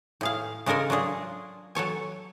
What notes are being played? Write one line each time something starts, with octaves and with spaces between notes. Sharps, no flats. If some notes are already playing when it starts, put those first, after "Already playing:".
A2 G#4 F5
C#3 G#3 A4 A#4 G#5
F#3 D4 F4 G#4
F#3 A4 C#5 G#5